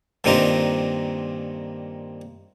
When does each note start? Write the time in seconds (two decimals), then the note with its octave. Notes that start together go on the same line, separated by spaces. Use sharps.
0.24 G2 A#2 D#3 C4 G4 A#5